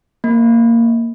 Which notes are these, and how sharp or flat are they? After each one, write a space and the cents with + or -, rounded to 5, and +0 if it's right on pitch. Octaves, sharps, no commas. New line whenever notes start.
A#3 -10